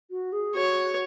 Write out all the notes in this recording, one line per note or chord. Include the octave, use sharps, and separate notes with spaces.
F#4
G#4
F#4 C#5